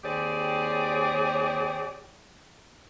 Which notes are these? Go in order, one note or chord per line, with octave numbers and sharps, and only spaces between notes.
D#2 C4 G4 G#4 C#5 D5